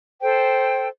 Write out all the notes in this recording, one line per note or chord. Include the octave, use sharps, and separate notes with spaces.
A4 C5 G5